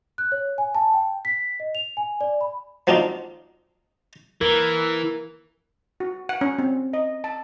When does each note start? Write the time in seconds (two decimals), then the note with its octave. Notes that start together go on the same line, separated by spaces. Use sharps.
0.18 F#6
0.32 C#5
0.58 G#5
0.75 A5
0.94 G5
1.25 B6
1.60 D#5
1.75 F7
1.97 G#5
2.21 D5
2.41 B5
2.87 F3 F#3 C4 D4 D#4 F4
4.41 E3 A#4
6.00 F#4
6.29 F#5
6.41 C#4
6.59 C4
6.93 D#5
7.24 A5